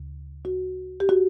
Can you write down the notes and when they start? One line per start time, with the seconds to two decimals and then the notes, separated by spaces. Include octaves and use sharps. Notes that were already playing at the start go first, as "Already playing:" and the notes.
Already playing: D2 C#3
0.45 F#4
1.00 G4
1.09 F#4